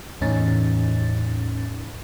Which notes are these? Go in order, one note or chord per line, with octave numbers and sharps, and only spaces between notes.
E2 A2 C#4 D#4 A6